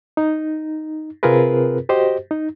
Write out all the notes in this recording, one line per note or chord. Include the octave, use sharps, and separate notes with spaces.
D#4
C3 C4 F4 G#4 A#4 B4
F#4 G4 C5 D#5
D#4